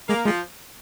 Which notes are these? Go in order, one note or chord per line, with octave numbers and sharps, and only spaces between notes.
G#3 A#3
F3 G#3